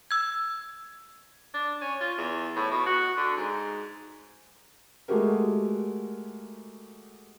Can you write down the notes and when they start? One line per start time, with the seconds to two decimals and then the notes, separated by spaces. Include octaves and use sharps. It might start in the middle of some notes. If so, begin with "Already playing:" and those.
0.11 E6 G#6
1.54 D4
1.81 C#4
2.01 F4
2.18 E2
2.56 A2
2.71 B2
2.86 F#4
3.17 D3
3.37 G#2
5.08 G#3 A3 F#4 G4 A#4